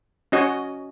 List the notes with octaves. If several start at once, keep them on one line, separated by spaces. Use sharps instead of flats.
C#4 F#4 C#5 D#5